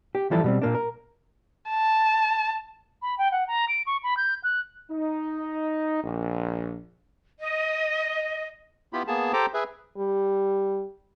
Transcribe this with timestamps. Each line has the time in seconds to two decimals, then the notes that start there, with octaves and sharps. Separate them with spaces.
0.15 G4
0.31 E3 F3 G3 E4 A4
0.44 B2 G3 C4
0.62 A#2 A#3 D4
0.75 A#4
1.70 A5
3.02 B5
3.18 G5
3.32 F#5
3.48 A#5
3.69 D7
3.87 C#6
4.03 B5
4.17 G6
4.44 F#6
4.91 D#4
6.04 A#1
7.40 D#5
8.93 B3 E4 F4 G4 B5
9.08 A#3 B3 G#4 A5
9.33 G4 A4 C5 G5 A#5 D6
9.54 G#4 B4 E5
9.97 G3